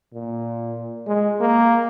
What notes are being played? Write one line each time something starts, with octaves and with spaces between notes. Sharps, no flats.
A#2
G#3
A#3